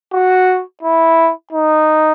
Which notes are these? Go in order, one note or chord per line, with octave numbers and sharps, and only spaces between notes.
F#4
E4
D#4